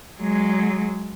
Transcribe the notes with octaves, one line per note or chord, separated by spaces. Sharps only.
F#3 G#3